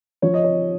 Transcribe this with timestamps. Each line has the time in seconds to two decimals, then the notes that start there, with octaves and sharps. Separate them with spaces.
0.22 F3 C#5
0.34 D#5
0.44 C#5